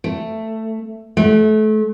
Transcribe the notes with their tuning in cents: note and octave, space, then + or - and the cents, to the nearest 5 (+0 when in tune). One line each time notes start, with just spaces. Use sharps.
A3 +10
A3 -30